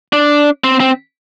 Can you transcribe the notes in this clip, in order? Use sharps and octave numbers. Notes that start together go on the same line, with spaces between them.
D4
C4
C4